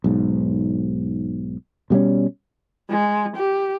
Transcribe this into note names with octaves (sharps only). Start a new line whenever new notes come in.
B1 G#2
B2 G3 G#3 C#4
G#3
G4